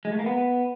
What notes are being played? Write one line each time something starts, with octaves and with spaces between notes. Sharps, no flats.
G#3
A3
A#3
B3